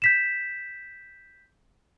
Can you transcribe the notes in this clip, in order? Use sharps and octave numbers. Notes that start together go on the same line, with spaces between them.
G6 B6 E7